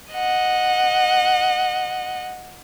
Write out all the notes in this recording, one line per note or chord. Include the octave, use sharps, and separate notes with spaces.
D#5 F#5